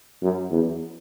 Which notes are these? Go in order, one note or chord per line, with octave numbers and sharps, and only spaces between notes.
F#2
E2